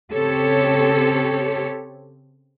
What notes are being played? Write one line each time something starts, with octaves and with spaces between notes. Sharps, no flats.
C#3 C4 G4 A4 C#5